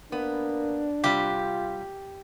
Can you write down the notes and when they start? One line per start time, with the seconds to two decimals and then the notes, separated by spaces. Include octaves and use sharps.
0.12 A#3 B3 D4
1.04 C3 G3 F4 G4